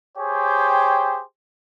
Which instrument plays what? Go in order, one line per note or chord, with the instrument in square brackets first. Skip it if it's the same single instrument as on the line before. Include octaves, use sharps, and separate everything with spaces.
[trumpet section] G4 G#4 C5 C#5 G5